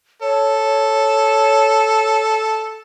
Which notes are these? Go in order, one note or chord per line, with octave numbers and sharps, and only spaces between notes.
A4 C#5